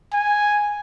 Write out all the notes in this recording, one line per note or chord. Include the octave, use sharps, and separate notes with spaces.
G#5